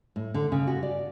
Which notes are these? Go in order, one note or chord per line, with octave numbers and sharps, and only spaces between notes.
A2
D3
C#3
F#4
D5